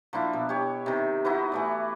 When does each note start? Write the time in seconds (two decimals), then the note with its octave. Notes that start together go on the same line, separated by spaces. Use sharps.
0.13 F3 A#3 D4 E4
0.33 B2
0.49 G4 C#5
0.86 C3 D#3
1.25 D#4 E4 F#4 B4
1.52 E3 A3 D5